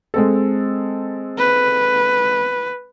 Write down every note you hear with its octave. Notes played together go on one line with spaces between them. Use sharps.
G#3 C4 A4
B4